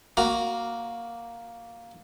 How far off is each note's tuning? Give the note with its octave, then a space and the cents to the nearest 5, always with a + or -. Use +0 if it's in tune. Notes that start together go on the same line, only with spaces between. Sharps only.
A#3 +0 F#4 +0 A#5 +30